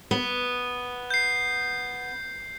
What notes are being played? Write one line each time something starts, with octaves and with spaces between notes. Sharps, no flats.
B3
G6 C7